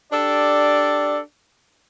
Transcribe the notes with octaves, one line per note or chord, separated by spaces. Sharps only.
D4 G4 A4 D5